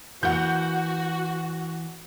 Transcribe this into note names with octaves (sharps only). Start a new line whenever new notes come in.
E3 A#3 F#4 F#5 G6